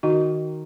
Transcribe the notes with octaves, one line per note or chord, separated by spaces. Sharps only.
D#3 F#4